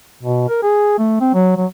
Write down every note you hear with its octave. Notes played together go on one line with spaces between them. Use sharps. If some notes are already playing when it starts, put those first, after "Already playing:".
B2
A#4
G#4
A3
C4
F#3
F#3